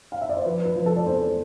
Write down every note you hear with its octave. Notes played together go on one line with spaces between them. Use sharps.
F5
E5
D5
C5
F3 B4
B4
F3
A4
D5
E2 C5